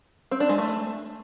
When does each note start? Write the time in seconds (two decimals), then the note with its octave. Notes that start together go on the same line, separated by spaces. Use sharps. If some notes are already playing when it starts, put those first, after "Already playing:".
0.31 C4
0.40 D4
0.49 G#3
0.58 A3